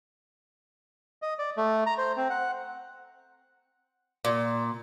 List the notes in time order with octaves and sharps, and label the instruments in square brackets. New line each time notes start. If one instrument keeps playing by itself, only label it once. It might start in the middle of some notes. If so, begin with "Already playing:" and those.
[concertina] D#5
D5
A3
A#5
C5
C4
F#5
[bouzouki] A#2